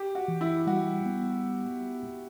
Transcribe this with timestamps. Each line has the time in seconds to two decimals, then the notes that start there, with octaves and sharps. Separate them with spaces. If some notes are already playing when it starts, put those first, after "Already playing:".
Already playing: G4
0.15 F#4
0.28 E3
0.41 E4
0.67 G3 F#4
1.06 B3